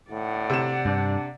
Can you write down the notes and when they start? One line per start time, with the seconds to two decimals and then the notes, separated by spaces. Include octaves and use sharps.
0.11 A2 D5 F#5
0.50 C3 E7
0.85 G2 D4